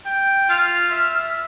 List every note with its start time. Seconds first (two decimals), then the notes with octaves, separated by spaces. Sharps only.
0.05 G5
0.49 F4 F6
0.91 E5